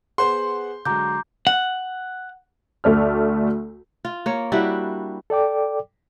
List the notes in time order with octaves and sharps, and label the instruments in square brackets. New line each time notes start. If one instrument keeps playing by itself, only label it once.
[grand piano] B3 C5 F#5 [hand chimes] G#4 [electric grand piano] C6
[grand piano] D3 F#3 G#3 [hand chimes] A#5 D6 G6
[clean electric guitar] F#5
[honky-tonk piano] D2 A3 D5 F6
[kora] F4
A#3 C#5
G3 D4 E4 F#4
[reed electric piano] A4 D5 G5 D6